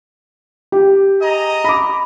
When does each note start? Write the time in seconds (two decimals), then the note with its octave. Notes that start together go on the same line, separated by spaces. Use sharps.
0.72 G4
1.22 G#4 D#5 A#5
1.64 B5 D6